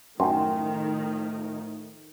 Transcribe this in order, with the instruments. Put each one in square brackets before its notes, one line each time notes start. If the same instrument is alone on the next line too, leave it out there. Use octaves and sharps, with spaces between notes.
[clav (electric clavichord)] F#2 [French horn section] A2 F3 A3 [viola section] D#3 [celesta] G5 C6 C#6